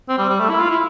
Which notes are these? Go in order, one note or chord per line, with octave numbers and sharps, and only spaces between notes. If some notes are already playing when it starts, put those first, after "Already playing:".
C4
G3
G3
A3
E4
F4
E4